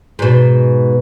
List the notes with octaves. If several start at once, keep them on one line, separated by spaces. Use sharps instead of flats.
G#2 B2